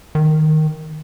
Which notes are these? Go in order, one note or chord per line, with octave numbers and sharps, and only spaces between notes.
D#3